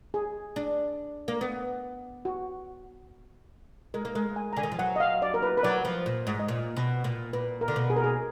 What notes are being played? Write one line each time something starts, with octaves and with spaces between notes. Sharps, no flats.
G#4
D4
A#3
B3
F#4
G#3 A#4
A#3
G#3 A#4
G#5
A#5
D3 G#5
D#3
F3
F#3 F#5
D#5
F5
D5
A#4
B4
B4
F#3 D5
F3
A#2
G#2
D#5
A#2 D5
B2
A#2
A#2 B4
A#4
D3
B2
G#4
A#4
G#4